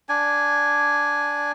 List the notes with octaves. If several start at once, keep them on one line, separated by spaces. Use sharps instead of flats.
D4 G#5